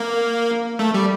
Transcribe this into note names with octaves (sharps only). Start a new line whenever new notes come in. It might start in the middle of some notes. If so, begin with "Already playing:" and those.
Already playing: A#3
A3
G3